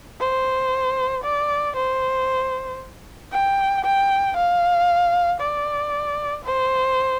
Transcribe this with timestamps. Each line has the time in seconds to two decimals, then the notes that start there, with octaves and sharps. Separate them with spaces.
0.20 C5
1.23 D5
1.75 C5
3.31 G5
3.85 G5
4.36 F5
5.40 D5
6.44 C5